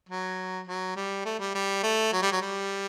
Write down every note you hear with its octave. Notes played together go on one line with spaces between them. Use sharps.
F#3
F#3
G3
A3
G3
G3
A3
F#3
G3
F#3
G3